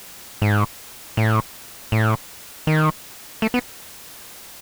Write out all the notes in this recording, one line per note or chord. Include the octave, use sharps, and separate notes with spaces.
G#2
A2
A2
D#3
A3
B3